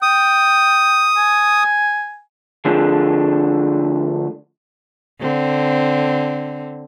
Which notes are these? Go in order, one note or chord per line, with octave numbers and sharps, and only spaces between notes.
G5 D#6
G#5
D3 F3 A3 D4 G#4
D3 C4